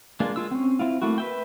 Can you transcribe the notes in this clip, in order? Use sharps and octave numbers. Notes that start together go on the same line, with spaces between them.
G#3 A#3 D4 F4
G#3 F4 E6
C4 C#4
C4 E4 F4
A3 A#3 E4 F#4
B4 E5 G5